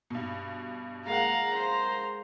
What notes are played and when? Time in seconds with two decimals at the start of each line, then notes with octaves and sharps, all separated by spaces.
0.10 G2 B2
1.07 G#3 A#3 F5 F#5 A#5
1.54 C5